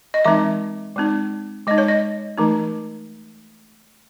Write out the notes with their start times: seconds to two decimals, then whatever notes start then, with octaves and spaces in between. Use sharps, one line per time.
0.14 D#5
0.25 E3 G#3 C4 D#4 E5
0.96 G#3 C4 D#4
1.67 G#3 D#4 D#5
1.78 C#5
1.88 D#5
2.38 E3 A3 D#4